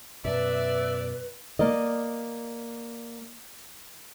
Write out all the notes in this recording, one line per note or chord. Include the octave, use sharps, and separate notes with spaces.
F#2 B2 B4 D5 E5
A#3 D5 D#5